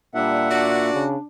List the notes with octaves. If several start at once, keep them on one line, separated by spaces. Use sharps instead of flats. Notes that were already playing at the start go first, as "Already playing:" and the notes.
A#2 G3 D4 E5 F#5
D4 F#4 D5
C#3